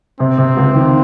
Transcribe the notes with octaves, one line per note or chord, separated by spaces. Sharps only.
C3 C4
C3
C#2
D#3